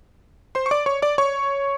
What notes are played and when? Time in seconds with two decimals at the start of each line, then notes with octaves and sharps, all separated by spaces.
0.55 C5 C6
0.66 C#6
0.71 D5 D6
0.86 C#5 C#6
1.02 D5 D6
1.18 C#5 C#6